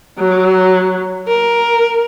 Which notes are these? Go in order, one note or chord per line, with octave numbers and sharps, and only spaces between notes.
F#3
A#4